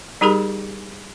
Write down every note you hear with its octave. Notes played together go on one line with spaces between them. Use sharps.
G3 D#4 G4 G#4 A#4 B5